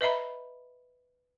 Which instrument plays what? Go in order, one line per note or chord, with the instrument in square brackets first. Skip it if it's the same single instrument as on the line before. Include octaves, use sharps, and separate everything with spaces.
[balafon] B4 D#5 E5 A#5 B5